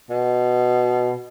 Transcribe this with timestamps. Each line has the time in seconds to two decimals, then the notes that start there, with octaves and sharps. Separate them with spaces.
0.10 B2